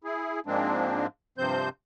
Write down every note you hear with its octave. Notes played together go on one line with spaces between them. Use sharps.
E4 G#4
G#2 F3 G#3 A#3 C4 D4
G2 C3 F3 C4 C5 G6